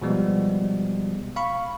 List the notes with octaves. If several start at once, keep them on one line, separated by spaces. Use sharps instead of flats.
B2 F3 G3 G#3 B3
F5 B5 C#6